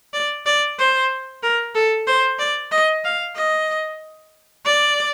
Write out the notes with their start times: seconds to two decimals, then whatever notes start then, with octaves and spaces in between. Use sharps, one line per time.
0.13 D5
0.46 D5
0.79 C5
1.43 A#4
1.75 A4
2.07 C5
2.39 D5
2.72 D#5
3.05 F5
3.36 D#5
4.66 D5